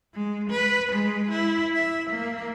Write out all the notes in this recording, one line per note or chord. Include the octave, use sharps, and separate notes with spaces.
G#3
B4
G#3
E4
E5
A#3